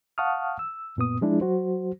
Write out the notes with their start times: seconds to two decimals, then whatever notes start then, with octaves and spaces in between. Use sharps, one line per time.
0.18 F5 F#5 A5 C#6 D#6 F6
0.59 E6
0.97 F#2 A#2 B3 D#6
1.21 F3 G#3 D4 E4 G#4
1.41 F#3 F#4 C5